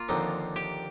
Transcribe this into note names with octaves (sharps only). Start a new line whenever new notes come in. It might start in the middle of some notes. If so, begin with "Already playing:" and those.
Already playing: A#3 F4
D#2 D3 F3 C4 D#4
G4